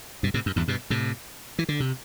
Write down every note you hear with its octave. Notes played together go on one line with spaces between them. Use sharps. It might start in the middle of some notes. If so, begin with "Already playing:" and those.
G2 B2
A2 C3
F#2
E2 G2
G2 B2
A2 C3
E3
D3
C3